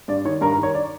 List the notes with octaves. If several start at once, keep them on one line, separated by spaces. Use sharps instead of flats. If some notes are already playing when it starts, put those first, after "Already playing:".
G2 D5
D#3 C#5
G2 A#4
A#4
D#3
C#5
D5